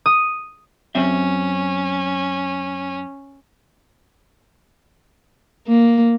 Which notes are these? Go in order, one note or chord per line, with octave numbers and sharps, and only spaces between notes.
D#6
F#2 C4 C#4 E5
A#3